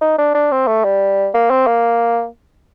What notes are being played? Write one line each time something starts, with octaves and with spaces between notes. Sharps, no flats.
D#4
D4
D4
C4
A3
G3
A#3
C4
A#3